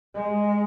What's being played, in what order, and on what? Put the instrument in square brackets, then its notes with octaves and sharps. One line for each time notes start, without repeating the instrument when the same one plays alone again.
[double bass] G#3